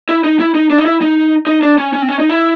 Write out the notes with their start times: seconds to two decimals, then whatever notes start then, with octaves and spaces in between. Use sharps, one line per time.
0.09 E4
0.24 D#4
0.40 E4
0.55 D#4
0.70 D4
0.78 D#4
0.86 E4
1.01 D#4
1.47 D#4
1.63 D4
1.78 C#4
1.93 C#4
2.02 C4
2.09 C#4
2.20 D#4
2.29 E4